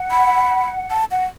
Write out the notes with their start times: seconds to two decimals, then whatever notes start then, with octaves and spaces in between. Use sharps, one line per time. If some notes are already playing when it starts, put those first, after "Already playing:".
Already playing: F#5
0.11 B5
0.91 A5
1.11 F#5